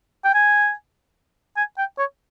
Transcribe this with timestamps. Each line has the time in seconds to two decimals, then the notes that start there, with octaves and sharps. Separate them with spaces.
0.25 G5
0.34 G#5
1.57 G#5
1.78 G5
1.98 C#5